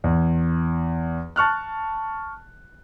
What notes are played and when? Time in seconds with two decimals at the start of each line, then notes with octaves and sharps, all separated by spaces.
0.04 E2
1.36 A5 C#6 F6 F#6